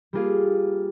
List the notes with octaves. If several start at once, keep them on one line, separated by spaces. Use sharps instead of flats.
G3 A#3 F4 G#4